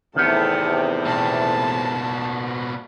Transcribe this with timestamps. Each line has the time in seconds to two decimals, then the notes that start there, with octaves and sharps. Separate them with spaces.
0.16 E2 A2 C3 D#3 B3 A5
1.06 B2 A#3 A5